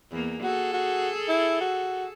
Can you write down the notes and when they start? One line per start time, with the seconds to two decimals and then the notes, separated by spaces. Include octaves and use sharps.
0.11 E2 A#3
0.44 F#4 G#4 A4
0.73 F#4
1.29 E4
1.61 F#4